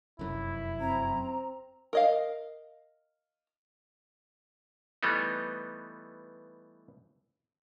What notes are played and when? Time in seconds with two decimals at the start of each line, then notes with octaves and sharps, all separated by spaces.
0.19 F1 F#2 E4
0.81 C4 A#5
1.93 A#4 D#5 F5
5.03 E3 G3 A3 B3 D#4